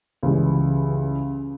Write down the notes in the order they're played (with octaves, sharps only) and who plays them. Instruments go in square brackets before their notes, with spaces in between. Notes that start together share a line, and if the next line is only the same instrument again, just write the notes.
[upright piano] C#2 C#3 E3 G3